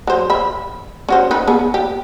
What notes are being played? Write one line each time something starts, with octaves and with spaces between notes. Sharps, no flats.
F#3 C5
E5 B5
C#4 F#4 C5
D#4 B4
B3 G#4
G4